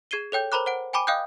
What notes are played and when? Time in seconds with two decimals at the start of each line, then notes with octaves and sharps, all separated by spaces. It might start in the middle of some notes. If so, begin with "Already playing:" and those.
0.11 G#4 G#6 C7 D#7 G7
0.32 A4 C#5 G5 G6
0.52 A#4 C5 A#5 B5 D6 F#6
0.66 C5 F#5 D7
0.93 G5 G#5 B5 D6 D#7
1.07 D#5 F5 G5 D#6 F#6 G6